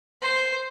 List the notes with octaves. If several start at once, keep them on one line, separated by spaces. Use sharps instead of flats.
C5